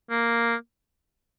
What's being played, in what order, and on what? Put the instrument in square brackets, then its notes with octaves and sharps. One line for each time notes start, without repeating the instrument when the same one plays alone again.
[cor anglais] A#3